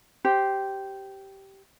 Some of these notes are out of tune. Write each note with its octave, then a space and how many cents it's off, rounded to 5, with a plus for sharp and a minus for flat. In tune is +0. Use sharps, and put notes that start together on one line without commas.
G4 -10 C5 +0